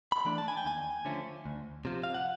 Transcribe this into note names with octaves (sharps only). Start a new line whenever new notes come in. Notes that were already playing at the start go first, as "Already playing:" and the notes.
B5
E3 A3 D4
A5
G#5
G5
D#2 G#5
D3 F3 A3 C#4
D2
C3 F3
F5
F#5